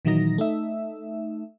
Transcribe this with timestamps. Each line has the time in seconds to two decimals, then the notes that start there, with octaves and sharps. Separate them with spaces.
0.05 A#2 D#3 E3 F#3 D#4 A#6
0.38 A3 D#4 E5